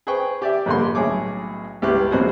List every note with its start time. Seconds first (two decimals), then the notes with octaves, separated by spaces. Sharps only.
0.07 G#4 B4 C5 G5 C#6
0.42 G4 D5 E5
0.66 A#1 G2 D3 A#3 C6
0.95 B1 A2 C#4 G#4 C#5 D6
1.82 C#2 G2 E4 G4 B4 C#6
2.11 A#1 G#2 C3 F#4 G#4 C5